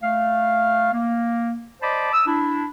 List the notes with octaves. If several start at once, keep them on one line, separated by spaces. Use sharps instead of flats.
A3 F5
A#3
C5 D5 D#5 A5 B5 D6
D#6 E6
D4 E4